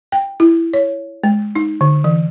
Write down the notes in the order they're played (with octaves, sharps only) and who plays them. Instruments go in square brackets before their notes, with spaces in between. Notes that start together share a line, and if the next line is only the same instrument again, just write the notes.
[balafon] G5
E4
C#5
G#3
D#4
D3
E3